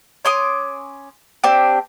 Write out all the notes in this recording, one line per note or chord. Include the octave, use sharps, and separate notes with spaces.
C#4 C6 D6 D#6
C4 D4 G4